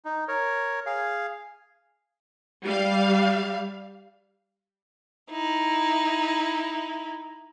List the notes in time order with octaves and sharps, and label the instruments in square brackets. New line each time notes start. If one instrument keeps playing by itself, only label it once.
[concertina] D#4
A#4 C#5
G#4 F5
[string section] G3 F5
[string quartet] D#4 E4